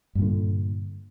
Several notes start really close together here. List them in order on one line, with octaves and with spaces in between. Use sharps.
G2 A#2 D3